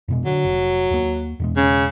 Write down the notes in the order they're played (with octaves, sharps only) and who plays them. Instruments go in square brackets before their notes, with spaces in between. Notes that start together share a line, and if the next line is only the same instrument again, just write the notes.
[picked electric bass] F2 B2 G#3
[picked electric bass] D3 [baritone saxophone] F#3
[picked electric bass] F1
D#2 A#3
E2 B2 G#3
[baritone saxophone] C#3